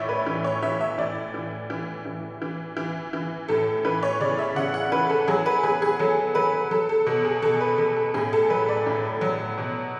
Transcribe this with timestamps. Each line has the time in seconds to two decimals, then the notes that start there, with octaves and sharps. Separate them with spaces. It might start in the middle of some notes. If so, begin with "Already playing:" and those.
Already playing: A2 E3 C#5 D5 E5
0.09 B4
0.27 E3
0.44 C#5
0.62 E3 E5
0.81 E5
0.98 A2 D5
1.34 E3
1.70 E3
2.05 E3
2.42 E3
2.77 E3
3.13 E3
3.48 A2 A4
3.85 E3 B4
4.03 C#5
4.20 C#3 D5
4.39 E5
4.56 C#3 F#5
4.74 F#5
4.92 E3 B4
5.10 A4
5.27 F#3 G#4
5.46 B4
5.63 F#3 G#4
5.82 G#4
5.99 F#3 A4
6.35 F#3 B4
6.71 F#3 A4
6.89 A4
7.06 B2 A4
7.25 G#4
7.42 B2 A4
7.61 B4
7.78 B2 A4
7.96 A4
8.14 A2 G#4
8.33 A4
8.50 F#3 B4
8.69 D5
8.86 A2
9.21 F#3
9.57 B2